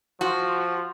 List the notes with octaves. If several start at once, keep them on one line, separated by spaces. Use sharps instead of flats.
F3 F#4